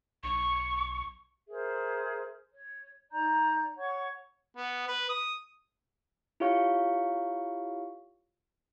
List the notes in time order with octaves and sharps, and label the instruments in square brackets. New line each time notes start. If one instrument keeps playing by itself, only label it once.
[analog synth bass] B1 [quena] C#6
[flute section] G#4 A#4 C5 E5
C#5
D#4 D5 A#5 G6
C#5 F#5 C#6 G#6
[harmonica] B3
B4
D#6
[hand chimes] E4 F4 G4 C#5 F5 C#6